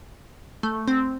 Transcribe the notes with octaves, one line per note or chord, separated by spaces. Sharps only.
A3
C4